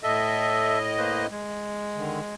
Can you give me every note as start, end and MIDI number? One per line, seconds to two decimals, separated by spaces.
0.03 1.27 45
0.03 0.79 69
0.03 1.27 75
0.03 0.79 76
0.98 1.26 58
0.98 1.26 71
0.98 1.26 72
1.30 2.35 56
1.96 2.20 50
1.96 2.20 51